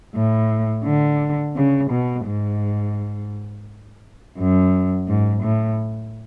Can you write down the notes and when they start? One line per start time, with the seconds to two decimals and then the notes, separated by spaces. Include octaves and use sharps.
0.15 A2
0.85 D3
1.56 C#3
1.91 B2
2.26 G#2
4.38 F#2
5.08 G#2
5.43 A2